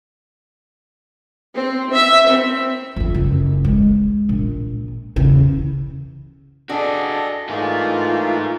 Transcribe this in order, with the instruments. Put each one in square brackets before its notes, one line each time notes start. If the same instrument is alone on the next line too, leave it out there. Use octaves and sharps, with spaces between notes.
[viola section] C4
E5
C4
[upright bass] F2 D3
F#1
G#3
A#1
E2 C#3
[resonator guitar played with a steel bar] D4 [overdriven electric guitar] F#4 G#4 [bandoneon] A4 D#5
[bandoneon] E3 A3 A#3 [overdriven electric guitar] D#4 G#4 [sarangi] F4